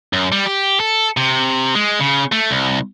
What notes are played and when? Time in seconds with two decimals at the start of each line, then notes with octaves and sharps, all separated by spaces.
0.13 F#2
0.32 G3
0.46 G4
0.80 A4
1.17 C3
1.75 G#3
2.00 C#3
2.32 A3
2.51 C2